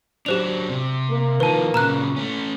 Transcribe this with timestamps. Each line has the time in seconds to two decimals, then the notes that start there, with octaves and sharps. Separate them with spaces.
0.26 F#3 D4 G4 C5 F7
0.70 C3
1.10 A#3
1.40 D#3 F3 B4 A5
1.74 A#2 C#3 A#5 F6 F#6
2.16 A3 C#4